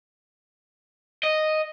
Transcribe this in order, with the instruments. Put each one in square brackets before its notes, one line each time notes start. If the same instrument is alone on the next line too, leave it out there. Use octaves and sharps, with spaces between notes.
[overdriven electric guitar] D#5